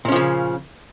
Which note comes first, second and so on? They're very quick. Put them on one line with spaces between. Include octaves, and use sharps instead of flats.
A#2 C#4 F3 C#3